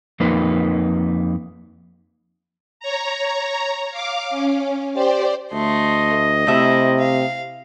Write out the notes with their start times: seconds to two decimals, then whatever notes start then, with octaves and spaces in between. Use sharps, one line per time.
0.20 F2 A#3 D#4 B4
2.80 C#5 A#5
3.91 F5 D6
4.30 C#4
4.94 G4 C5 D5
5.53 D2 A3 D#5 C6
6.47 C3 A3 E4 C5 E5
6.99 F5